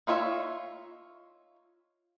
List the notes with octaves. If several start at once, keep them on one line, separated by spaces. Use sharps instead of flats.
D#4 F4 C#5 D5 E5